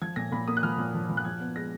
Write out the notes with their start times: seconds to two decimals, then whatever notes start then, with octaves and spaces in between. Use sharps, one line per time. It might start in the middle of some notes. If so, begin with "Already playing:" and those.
0.02 F3 G#6
0.16 A#2 A#6
0.32 A#2 B5
0.48 A#3 D#6
0.57 F#6
0.63 F3 F6
0.78 A#2
0.94 F3
1.09 F3
1.17 F#6
1.25 F3 G#6
1.40 B3
1.56 G#3 A#6